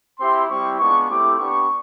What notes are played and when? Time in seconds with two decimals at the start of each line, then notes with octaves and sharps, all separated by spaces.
0.19 C4 E4 G4 C6
0.49 G3 C4 E4 G4 C#6
0.79 G#3 B3 D4 F4 C#6
1.09 A3 C4 E4 G4 D6
1.38 B3 D4 G4 C#6